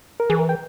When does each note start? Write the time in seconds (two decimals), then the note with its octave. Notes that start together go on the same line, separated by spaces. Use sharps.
0.20 A#4
0.30 E3 G#4
0.39 A#4
0.49 G5